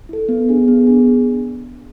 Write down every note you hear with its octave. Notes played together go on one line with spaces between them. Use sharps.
E4 A4
B3
D4 G#4
B3
D4 G#4